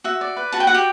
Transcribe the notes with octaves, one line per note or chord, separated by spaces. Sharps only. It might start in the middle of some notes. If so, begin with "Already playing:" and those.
F#4 E5
D5
B4
F#4 A5
G5
F#4 F#5
G4 G5